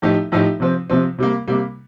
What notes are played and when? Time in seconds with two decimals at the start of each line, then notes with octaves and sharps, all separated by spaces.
0.02 A2 F3 A3 D#4 G4
0.32 A2 F3 A3 D#4 G4
0.60 C3 F3 C4
0.90 C3 F3 C4
1.19 C3 G3 A#3
1.48 C3 G3 A#3